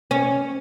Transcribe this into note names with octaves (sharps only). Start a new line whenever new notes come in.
C#4